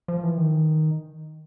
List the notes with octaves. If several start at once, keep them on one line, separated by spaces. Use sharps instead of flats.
F3
E3
D#3